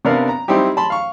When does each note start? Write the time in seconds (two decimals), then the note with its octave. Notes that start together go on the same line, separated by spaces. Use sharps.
0.05 C3 B3 D4 A#4 D5 F5
0.29 A#5
0.48 G3 C4 D#4 E4 G4
0.77 A5 B5 C6
0.90 F5 C#6